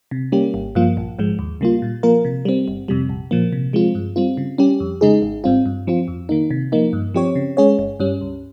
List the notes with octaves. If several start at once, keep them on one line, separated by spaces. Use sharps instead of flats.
C3
G3 A#3 C#4 G4
G#1
G2 F3 A#3 F4
A#1
G#2 F3 G#3
D#2
C#3 G3 A#3 F4
A#2
F3 A#3 F4 A#4
C3
G3 C4
G1
F2 C3 G3
A#1
A#2 F3 A#3
C3
F3 G#3 C4 F4
G2
G3 C4 F4
C#3
G3 C#4 G4
F2
C#3 G#3 D#4 G#4
G#1
G#2 G3 C4 F4
G2
F3 C4 F4
F2
D#3 A#3 D#4
C3
F3 A#3 D#4
G2
F3 C4 G4 C#5
C#3
G#3 C#4 G#4 C#5
G1
G2 G3 C#4
C#2